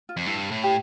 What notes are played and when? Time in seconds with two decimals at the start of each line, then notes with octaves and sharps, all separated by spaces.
0.09 F4
0.17 F2
0.26 G2 E4
0.51 A2
0.64 G4